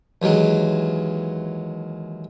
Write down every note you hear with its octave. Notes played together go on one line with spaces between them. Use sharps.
D#2 E3 F#3 G#3